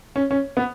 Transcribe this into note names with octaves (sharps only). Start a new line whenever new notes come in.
C#4
C#4
B3